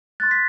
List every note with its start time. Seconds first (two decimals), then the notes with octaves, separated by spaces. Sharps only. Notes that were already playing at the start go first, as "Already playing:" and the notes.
0.20 C6 F#6 A6
0.31 B6